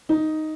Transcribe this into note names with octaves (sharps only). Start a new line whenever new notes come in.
D#4